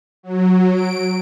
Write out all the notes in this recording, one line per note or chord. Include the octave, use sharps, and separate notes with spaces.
F#3
D7